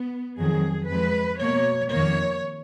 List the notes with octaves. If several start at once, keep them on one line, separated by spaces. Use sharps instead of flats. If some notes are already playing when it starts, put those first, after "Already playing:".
Already playing: B3
F2 D#3 F#3 G#4
F2 F3 G#3 B4
B2 A#3 C#5
F2 D#3 A#3 C#5